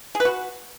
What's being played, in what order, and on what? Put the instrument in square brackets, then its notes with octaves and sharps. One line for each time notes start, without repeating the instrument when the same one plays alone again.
[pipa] G#4
B4
F#4